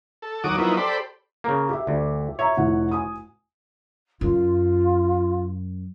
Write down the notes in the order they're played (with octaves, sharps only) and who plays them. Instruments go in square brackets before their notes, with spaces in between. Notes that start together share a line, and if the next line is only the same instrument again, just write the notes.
[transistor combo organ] A4
D#2 F#3 F#4 D6 D#6
F3 F#3 A#3 B3 D#4 E4
G4 A4 C5 D5 B5
[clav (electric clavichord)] C#3 A#3
[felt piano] G4 E5
[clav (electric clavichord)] D2
[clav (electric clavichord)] C#5 [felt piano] E5 A#5
[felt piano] F1 E4 F#5
G#5 D#6
[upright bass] F#2 [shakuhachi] F4